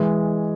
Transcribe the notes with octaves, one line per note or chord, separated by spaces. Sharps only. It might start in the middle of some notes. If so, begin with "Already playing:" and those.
Already playing: E3 G#3